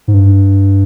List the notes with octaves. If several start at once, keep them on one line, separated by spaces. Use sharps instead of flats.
G#2
G2